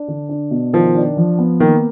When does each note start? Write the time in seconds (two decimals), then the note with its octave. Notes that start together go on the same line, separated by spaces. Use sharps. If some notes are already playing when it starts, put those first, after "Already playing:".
Already playing: D4
0.08 D3
0.29 D4
0.51 B2
0.73 D#3 F3
0.95 D4
1.17 F3
1.39 B3
1.60 D#3 A#3